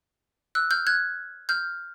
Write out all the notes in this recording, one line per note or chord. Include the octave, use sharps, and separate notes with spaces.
E6 F#6
F6 G6
F#6 G#6
F6 G6